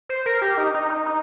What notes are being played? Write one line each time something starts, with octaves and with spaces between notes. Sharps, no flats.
C5
A#4
G4
D#4
D#4
D#4
D#4